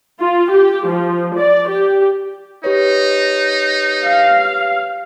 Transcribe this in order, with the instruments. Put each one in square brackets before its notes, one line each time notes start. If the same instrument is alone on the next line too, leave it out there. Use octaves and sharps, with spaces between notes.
[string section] F4
G4
F3
D5
G4
[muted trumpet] D#4 [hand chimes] G4 B4 C#5
[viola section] F5